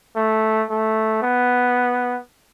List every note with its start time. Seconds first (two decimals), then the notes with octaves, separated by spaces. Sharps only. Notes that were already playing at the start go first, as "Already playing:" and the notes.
0.16 A3
0.70 A3
1.22 B3